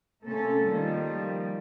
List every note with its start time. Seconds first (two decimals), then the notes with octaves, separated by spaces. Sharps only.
0.23 C3 A3 A#3 C#4 A4
0.64 D#3 F3 G3 A#3